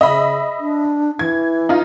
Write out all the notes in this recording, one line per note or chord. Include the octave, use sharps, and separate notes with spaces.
C#3 D#5 E5 B5
D4
E3 G#6
D#4 F4